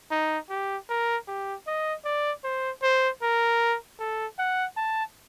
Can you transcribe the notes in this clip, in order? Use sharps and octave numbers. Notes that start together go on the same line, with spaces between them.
D#4
G4
A#4
G4
D#5
D5
C5
C5
A#4
A4
F#5
A5